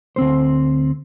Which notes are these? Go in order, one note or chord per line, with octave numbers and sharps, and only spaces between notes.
D2 C4 C5